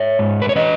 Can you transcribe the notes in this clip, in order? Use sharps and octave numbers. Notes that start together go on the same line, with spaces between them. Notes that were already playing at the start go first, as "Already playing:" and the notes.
Already playing: C#5 E5
G#2
B4
C#5
E3 B4 D#5